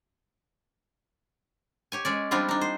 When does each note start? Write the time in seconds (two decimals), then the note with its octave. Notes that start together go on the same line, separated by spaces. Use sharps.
1.92 G4 C#5 G#5
2.05 G#3 C#4 D5
2.31 F3 G3 C4 D4 E4 F4
2.48 D4 D#4
2.61 C5